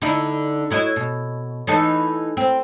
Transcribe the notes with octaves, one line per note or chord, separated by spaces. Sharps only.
D3 D#4 E4
F#3 E4 D#5
B2
E3 D#4 A4
C4